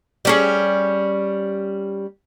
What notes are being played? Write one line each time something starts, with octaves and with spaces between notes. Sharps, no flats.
G3 C#4 G#4